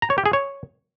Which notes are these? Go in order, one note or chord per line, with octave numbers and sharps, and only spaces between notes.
A#5
C#5
G4
G#4
C#5